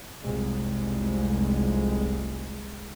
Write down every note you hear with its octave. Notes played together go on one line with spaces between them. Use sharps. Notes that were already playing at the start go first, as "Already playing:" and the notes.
F1 C2 G#3